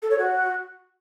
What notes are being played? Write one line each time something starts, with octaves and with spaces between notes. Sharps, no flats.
A4
C#5
F#4